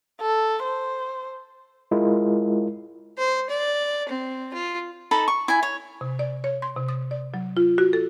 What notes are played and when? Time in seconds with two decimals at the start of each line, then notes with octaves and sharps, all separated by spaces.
0.22 A4
0.63 C5
1.91 G#3 E4 F4 A#4
3.18 C5
3.49 D5
4.09 C4
4.53 F4
5.11 D#4 A4 A5 B5
5.28 C#6
5.48 E4 G#5
5.63 C#5
6.01 C3
6.19 D5
6.44 C#5
6.62 C6
6.76 C3
6.89 D#6
7.11 D5
7.34 F#3
7.57 F4
7.78 F#4
7.93 A4